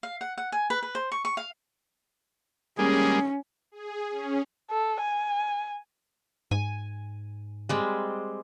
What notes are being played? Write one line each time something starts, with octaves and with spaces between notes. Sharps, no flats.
F5
F#5
F#5
G#5
B4
B4
C5
C#6
C#6
F5
G3 G#3 A#3 C#4 G#4
G#4
C#4
A4
G#5
G#2 G#5
G3 G#3 C4